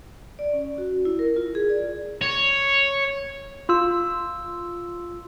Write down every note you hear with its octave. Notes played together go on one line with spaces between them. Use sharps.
D5
C#4
F#4
E4
A#4
F4
G#4
D5
C#5
F4 E6